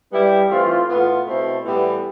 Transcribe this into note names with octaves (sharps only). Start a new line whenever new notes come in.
G3 B3 E4 G4
E3 A3 C4 F4
A2 E3 B3 F4
B2 A3 C4 E4 A4
A2 E3 G3 B3